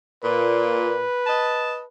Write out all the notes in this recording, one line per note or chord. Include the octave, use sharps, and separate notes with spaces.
A#2 B4
D#5 A5